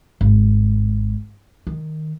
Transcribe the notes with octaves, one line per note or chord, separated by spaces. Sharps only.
G#1
D#3